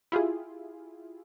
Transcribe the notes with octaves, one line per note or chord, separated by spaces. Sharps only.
E4 F4 G4 G#4